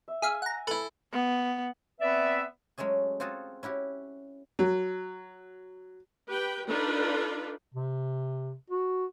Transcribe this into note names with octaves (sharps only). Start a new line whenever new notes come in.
E5
G#4 E5 F5 G#5
F#5 A#5
E4 A4 B4
B3
B3 C4 B4 D5 E5
F#3 G#3 A3 C#4 G#4
C4 F4 F#4 G#4 A4
C#4 E4 F#4 G4
F#3
G4 B4 G5
D4 D#4 F4 A4 B4 D5
C3
F#4